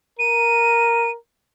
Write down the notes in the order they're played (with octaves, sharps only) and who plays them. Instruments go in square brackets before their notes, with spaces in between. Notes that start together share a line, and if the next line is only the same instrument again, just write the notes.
[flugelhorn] A#4 [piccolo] D#7